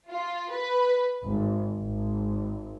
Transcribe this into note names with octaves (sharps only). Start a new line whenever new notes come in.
F4
B4
G#1
G#1